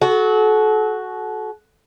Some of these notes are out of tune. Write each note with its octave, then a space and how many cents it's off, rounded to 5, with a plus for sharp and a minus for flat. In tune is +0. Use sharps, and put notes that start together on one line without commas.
F#4 +0 A4 -35